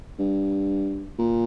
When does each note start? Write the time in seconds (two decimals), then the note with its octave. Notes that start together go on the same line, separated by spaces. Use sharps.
0.19 G2
1.19 A#2